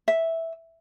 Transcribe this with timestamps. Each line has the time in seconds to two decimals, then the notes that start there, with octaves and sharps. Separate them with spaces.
0.08 E5